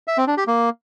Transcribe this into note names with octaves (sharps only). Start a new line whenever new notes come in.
E5
C4
D4
G4
A#3